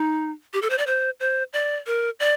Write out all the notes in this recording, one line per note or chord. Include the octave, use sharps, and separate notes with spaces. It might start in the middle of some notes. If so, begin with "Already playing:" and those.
Already playing: D#4
G4
A4
C5
D5
C5
C5
D5
A#4
D5